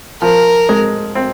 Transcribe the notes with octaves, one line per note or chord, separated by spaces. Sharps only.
F3 A#4
G#3
C4